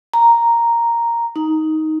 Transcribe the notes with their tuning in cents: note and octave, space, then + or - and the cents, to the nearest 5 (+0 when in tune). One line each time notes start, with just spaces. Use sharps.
A#5 +0
D#4 +10